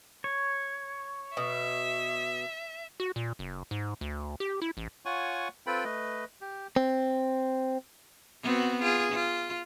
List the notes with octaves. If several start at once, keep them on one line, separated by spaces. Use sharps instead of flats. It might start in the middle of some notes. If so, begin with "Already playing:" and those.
C#5
B2 E5
F#4
A#2
F#1
G#2
D2
G4
E4
A1
F4 C#5 F#5 G#5 C#6
C4 F4 A4 B4 G5 B5
A3 B4 D#5
G4
C4
B3 C4 F#4
F4 G#4
F4